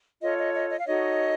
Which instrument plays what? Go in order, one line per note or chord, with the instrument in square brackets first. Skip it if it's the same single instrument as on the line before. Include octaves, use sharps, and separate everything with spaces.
[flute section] F4 A4 C#5 D#5
D#5
D#5
D#5
F5
D#4 F#4 A4 C#5 D#5